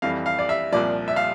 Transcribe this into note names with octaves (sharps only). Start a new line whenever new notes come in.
F2 E3 G3 F5
F5
D5
E5
C2 A#2 F3 D5
E5
F5